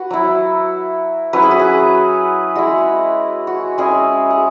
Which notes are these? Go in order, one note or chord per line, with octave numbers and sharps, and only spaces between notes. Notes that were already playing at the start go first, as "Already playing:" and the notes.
Already playing: F#4 B4
F#3 E4
F#3 C#4 E4 B4
G#4
F#4
G#4
G#3 E4 F#4
F#4
G#3 C#4 E4 G#4
G#4